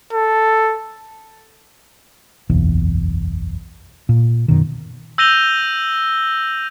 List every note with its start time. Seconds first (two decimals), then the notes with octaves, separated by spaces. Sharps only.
0.13 A4
2.49 F#1 B1 E2
4.09 A#2
4.48 F#2 B2 D#3
5.18 E6 G6 A#6 D#7 F7 G7